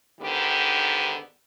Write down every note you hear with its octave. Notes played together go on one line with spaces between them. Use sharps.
G#2 D3 D#3 B3 G4